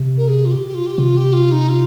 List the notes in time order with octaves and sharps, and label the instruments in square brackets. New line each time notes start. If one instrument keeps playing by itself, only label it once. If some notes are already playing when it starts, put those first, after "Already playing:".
Already playing: [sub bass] C3
[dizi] A#4
G#4
F4
G4
G4
F4
G4
[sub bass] C3 [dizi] F4
[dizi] G4
F4
D#4
F4